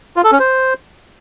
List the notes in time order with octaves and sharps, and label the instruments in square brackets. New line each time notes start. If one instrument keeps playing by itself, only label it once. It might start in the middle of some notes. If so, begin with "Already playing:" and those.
[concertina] F4
A4
C#4
C5